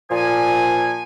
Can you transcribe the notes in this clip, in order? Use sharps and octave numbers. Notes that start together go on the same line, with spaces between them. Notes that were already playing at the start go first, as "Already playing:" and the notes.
A#2 F3 G#5